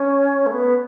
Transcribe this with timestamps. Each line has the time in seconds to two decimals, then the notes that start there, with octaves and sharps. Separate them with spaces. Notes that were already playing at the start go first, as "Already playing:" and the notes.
Already playing: C#4
0.46 A3
0.52 B3